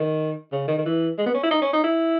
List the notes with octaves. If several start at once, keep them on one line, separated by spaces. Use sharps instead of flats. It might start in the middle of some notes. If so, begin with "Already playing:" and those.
Already playing: D#3
C#3
D#3
D#3
E3
G#3
B3
C#4
E4
D#4
C#4
D#4
E4